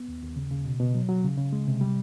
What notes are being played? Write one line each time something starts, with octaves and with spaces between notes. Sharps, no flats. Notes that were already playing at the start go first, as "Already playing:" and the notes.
Already playing: B3
D#2
D#2
C#3
C#3
B2
B2
F#3
F#3
C#3
C#3
G#3
C3
G3